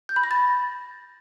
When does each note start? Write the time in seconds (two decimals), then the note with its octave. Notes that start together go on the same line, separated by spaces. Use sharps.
0.09 G6
0.16 B5
0.24 A#6
0.31 A6